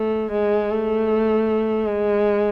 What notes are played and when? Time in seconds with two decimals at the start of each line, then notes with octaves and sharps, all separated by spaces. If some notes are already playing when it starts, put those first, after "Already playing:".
Already playing: A3
0.32 G#3
0.71 A3
1.86 G#3